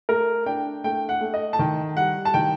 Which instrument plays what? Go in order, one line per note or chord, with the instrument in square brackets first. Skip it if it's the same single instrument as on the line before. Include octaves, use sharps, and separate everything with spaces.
[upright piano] A3 A#4
D4 G5
A3 G5
F#5
A3
D#5
A5
D#3 G5
G3 F#5
A5
D#3 G5